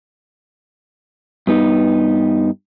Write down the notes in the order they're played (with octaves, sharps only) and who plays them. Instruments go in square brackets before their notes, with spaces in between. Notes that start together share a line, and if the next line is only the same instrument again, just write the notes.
[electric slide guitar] G2 B3 D#4